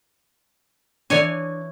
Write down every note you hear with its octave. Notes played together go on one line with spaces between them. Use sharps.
E3 D4 C#5 D5 G#5